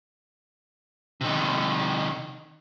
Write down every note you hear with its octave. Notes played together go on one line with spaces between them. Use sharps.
C3 D#3